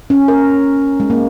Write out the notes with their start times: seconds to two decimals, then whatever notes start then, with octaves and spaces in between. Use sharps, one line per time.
0.10 C#4
0.28 A#4
1.00 G#3
1.10 A#3